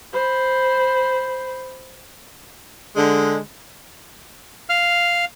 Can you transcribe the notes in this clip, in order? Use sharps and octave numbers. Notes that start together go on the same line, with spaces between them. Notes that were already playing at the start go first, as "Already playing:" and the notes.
C5 B5
D3 G#3
F5 F6